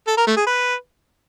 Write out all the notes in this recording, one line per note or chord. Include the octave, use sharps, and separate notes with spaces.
A4
A#4
A3
G#4
B4